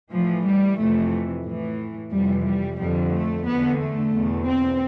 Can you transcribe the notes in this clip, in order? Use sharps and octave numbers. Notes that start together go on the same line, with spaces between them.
A2 E3 F3
G3
F2 C3 E3 A3
A2 E3
F2 C3 E3 G3
G3
F2 D3 G3
A3
E2 D3 B3
A3
E2 B2
C4